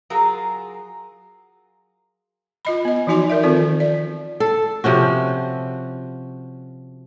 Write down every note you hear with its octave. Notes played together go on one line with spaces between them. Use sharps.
F#3 F4 G#4 A#4
F4 D#5 B5
B3 D#5
E3 F3 D#4 F#4 G#5 C6
A#4 D5 E5
D#3 F3 C4 F4 A4 D5
D5
A4
C3 F3 C#4 F#4